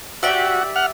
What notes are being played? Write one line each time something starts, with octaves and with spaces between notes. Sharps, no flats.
F#4 G4 D5 E5
F#5 F6